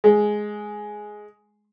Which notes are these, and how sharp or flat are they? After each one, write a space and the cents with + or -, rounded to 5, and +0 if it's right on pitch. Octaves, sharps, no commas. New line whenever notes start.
G#3 +10